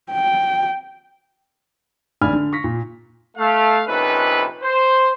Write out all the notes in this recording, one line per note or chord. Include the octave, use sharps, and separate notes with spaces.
G5
A1 D3 D5 G#5 B5 F6
D3
C#6 A#6 B6
A#2
A3 F5
A#1 C3 C#4 D#4 A4 B4
C5